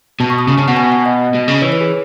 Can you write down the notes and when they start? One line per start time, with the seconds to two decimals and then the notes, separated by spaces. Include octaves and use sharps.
0.20 B2 A5
0.30 C#6
0.39 D#6
0.48 C#3 C#6
0.58 C#3 A5
0.68 B2 F#5
0.77 G#5
0.92 F#5
1.06 D#5
1.34 B2
1.48 C#3
1.62 E3 C#5
1.72 B4
1.81 G#4